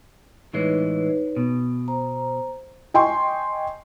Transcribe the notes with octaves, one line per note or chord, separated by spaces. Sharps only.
A2 E3 G#3 D#4 B4 C#5
B2
C5 A#5
D#5 G5 G#5 C6 C#6